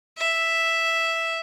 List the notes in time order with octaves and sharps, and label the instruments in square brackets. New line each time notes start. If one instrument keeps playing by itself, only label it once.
[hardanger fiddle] E5